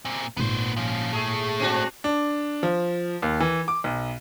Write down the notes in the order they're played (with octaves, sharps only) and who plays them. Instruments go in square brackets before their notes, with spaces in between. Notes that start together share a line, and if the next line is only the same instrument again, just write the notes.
[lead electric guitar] A#2 C4
[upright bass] G#1 A#2 [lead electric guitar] B3 C5
[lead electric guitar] F3 C#4
[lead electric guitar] A2 A3 [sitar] G#4
[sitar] C4 D4 F#4
[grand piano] D4
F3
D#2
E3
D6
B1